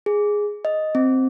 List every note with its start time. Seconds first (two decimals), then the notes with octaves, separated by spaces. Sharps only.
0.06 G#4
0.65 D#5
0.95 C4